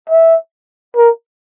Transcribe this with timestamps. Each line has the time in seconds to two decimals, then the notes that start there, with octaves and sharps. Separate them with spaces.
0.10 E5
0.96 A#4